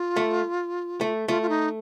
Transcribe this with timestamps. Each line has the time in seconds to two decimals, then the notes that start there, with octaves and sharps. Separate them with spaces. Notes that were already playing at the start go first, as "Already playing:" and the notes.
Already playing: F4
0.16 A3
1.01 A3
1.28 A3 F4
1.42 F4
1.49 D#4